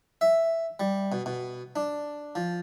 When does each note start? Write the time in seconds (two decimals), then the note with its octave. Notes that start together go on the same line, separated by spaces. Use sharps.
0.21 E5
0.80 G3
1.12 B2
1.26 B2
1.76 D4
2.35 F3